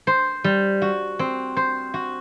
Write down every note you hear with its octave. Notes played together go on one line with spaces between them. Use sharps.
C5
G3
F#4
C4
C5
F#4